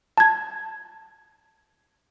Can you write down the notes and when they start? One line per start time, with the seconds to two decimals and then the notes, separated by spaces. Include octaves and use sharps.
0.18 A5 G#6